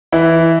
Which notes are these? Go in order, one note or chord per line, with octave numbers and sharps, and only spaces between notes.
E3 E4